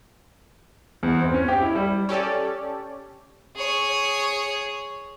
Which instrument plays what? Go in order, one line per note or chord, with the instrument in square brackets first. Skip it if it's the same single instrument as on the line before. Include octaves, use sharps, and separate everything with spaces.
[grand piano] E2
C4
C#4
G4
E4
G3
[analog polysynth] C#4 G4 A4 D5
[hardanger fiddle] G#4 C#5